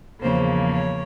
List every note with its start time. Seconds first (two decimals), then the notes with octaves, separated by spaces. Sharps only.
0.21 E2 C#3 F3 A#3 C5
0.71 C#5